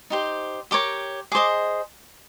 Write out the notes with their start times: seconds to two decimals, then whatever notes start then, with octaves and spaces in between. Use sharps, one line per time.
0.10 D#4 G4 C5
0.71 G4 A#4 C#5 D6
1.32 G#4 C5 D#5 D6